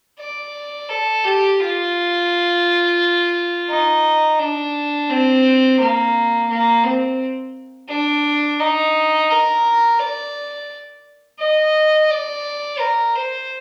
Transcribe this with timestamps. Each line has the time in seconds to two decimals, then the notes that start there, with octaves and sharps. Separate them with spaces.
0.19 D5
0.89 A4
1.24 G4
1.60 F4
3.70 D#4
4.39 D4
5.10 C4
5.80 A#3
6.49 A#3
6.84 C4
7.89 D4
8.60 D#4
9.30 A#4
10.00 D5
11.39 D#5
12.10 D5
12.79 A#4
13.15 C5